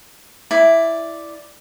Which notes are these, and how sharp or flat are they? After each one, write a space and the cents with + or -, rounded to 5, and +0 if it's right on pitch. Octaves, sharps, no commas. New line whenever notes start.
E4 +0 D5 +0